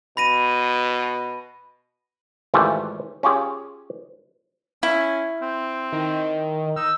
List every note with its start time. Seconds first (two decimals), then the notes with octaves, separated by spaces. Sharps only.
0.17 B2 B5 A#6 D#7
2.54 G#1 E3 A3 F4 G4
3.23 C#4 F4 G4 G#4
4.83 C#4 E4
5.42 C4
5.93 D#3
6.76 D#4 E6